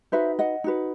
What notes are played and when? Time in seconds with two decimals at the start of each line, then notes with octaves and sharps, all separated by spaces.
0.12 D#4 F#4 B4 C5 E5
0.39 D#5 F#5
0.64 D#4 F#4 B4